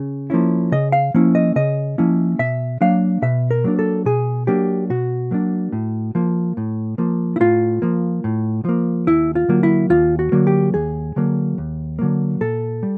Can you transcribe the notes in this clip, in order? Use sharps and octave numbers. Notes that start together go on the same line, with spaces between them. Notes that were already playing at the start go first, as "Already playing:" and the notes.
Already playing: C#3
F3 A#3 C#4 E4
C#3 D#5
F5
F3 A#3 C#4 E4
D#5
C#3 D#5
F3 A#3 C#4 E4
B2 E5
F#3 A#3 D4 F5
B2 E5
A#4
F#3 A#3 D4
A4
B2 G#4
F#3 A#3 D4 G4
B2 F#4
F#3 A#3 D4
A2
F3 A#3
A2
F3 A#3
E4
A2 F4
F3 A#3
A2
F3 A#3
D#2 E4
F4
D3 F#3 A#3
E4
D#2 F4
F#4
D3 F#3 A#3
G4
D#2 G#4
D3 F#3 A#3
D#2
D3 F#3 A#3
A#2 A4
G3